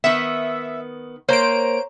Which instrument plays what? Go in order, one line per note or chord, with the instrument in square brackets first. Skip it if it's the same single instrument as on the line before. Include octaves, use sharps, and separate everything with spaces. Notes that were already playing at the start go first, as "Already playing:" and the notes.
[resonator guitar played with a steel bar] D#3 B3 [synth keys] E5
[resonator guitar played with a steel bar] A#3 [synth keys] C5 D7 [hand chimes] C#5 A#5